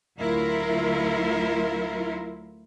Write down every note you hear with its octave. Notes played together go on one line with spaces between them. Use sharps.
D2 F#3 E4 F4 A#4